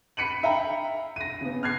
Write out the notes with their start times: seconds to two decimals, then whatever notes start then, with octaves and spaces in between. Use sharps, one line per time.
0.17 B5 B6 C#7 D#7 F#7
0.43 E5 F5 G5 A#5 B5
1.16 A#6 D#7
1.41 C#3 B3
1.63 F6 F#6 G#6 C7